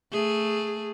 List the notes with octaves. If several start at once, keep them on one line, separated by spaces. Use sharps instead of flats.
A3 G#4